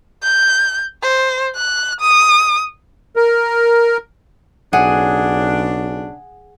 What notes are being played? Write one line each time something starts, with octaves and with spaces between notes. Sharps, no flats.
G6
C5
F#6
D#6
A#4
B1 C#3 D4 G#4 F#5